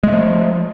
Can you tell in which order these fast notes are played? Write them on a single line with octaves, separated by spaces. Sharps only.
G#3 A3 F3